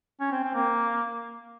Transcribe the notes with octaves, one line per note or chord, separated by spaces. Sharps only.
C#4
C4
C4
A#3